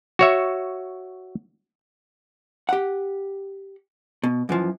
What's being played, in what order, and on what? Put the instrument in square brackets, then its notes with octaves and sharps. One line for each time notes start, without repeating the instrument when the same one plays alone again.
[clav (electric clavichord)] F#4 C#5 E5
[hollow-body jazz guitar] G4 F#5
B2
F#2 E3 F3